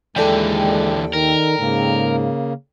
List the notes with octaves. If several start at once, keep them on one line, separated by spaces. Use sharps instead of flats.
D#2 D3 E3 G#3 A4 D5 G5
D#3 A#4
G#2 C#3 A#3